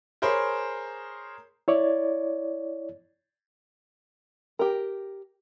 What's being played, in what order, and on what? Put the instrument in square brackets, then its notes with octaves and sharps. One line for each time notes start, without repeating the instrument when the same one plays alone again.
[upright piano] G#4 A#4 C5 C#5 B5
[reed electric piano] E4 C#5 D5
[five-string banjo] G4 A#4